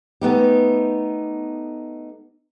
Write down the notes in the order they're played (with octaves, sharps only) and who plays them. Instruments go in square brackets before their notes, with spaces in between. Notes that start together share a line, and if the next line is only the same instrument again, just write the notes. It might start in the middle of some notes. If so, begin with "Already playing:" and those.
[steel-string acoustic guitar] A3 B3 D#4 G4